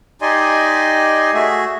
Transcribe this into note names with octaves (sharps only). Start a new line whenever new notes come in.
D#4 G4 D5 D#5 G#5 C6
A3 F#4 G#4 E5